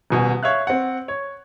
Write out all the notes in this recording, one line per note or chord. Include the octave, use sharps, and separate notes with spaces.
D#1 B2 G#5
C#5 E5 F5 F#6
C4 F#5
C#5